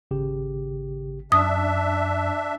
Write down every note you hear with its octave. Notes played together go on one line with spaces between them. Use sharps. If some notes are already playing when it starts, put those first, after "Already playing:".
G#1 C#3 G4
F#2 D4 E5 D#6